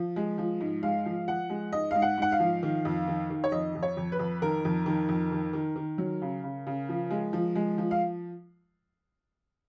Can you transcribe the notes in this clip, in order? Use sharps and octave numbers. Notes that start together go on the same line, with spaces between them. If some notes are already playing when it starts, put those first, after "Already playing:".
Already playing: F3
G#3
F3
G#2
G#3 F5
F3
F3 F#5
G#3
G#2 D#5
G#2 F5
F#5
G#2 F#5
F5
F3
D#3
F2
D#3
D#3
C#5
F2 D#5
F2
C#5
F2
B4
F2
D#3 A#4
F2
D#3
F2
D#3
D#3
D#3
F#3
C#3
C#3
C#3
F3
G#3
F3
G#3
F3
F5